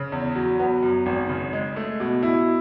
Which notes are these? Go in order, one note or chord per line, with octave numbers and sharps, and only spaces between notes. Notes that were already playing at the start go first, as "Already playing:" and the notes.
Already playing: C#3
E2
F#3
B3
F#2
G#1
C#3
G#3
A3
B2
E4